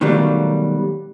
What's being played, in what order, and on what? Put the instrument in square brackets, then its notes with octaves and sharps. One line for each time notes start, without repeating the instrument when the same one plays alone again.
[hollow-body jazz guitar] B2 D#3 F#3 G3 A3 A#3